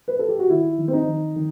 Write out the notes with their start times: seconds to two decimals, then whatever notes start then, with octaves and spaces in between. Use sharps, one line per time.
0.08 B4
0.19 A4
0.28 G4
0.39 F#4
0.50 D#3 E4
0.78 D#3
0.88 C4
0.93 D#4
1.08 D#3
1.36 D#3